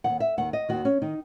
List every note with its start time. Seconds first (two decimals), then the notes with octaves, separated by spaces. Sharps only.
0.04 D#3 F#5
0.09 D#2
0.20 E5
0.37 D#2 D#3 F#5
0.53 D#5
0.69 D#2 D#3 F#4
0.85 C#4
1.02 D#3 D#4